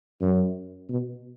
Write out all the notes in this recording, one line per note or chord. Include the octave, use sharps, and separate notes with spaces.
F#2
B2